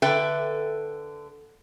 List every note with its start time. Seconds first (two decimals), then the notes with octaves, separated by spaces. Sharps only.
0.02 D3 A4 B4 E5 G5